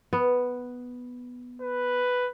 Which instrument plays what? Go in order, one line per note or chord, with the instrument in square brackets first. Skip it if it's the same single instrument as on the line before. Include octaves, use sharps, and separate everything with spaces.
[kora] B3
[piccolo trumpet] B4